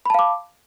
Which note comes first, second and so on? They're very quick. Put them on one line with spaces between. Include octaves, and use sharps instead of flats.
B5 A5 F5 D6